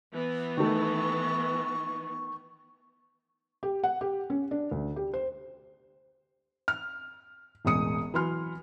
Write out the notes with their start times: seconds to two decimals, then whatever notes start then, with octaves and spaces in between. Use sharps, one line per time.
0.13 E3 B3
0.57 D#3 A3 C#6
3.63 G4
3.84 F#5
4.01 G4
4.30 C#4
4.51 D4
4.71 D2
4.96 G4
5.14 C5
6.68 F6
7.65 E1 A1 G#3 D#6 C#7
8.14 E3 F#3 C6 F6